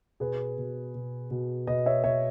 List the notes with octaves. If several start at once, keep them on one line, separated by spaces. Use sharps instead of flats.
B2 G#4 B4
B2
B2
B2
B2 B4 D#5
C#5 E5
B2 C#5 E5